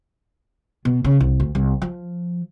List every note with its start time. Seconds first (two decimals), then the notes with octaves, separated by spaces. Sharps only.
0.85 B2
1.04 C#3
1.20 C2
1.40 D2
1.55 C2
1.82 F3